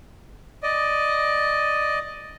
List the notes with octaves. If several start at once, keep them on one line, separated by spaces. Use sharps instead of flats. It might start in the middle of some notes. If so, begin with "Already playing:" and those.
D5 D#5